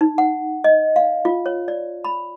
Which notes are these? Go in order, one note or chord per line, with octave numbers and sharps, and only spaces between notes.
D#4
F#5
D#5
F5
F4
C#5
D5
B5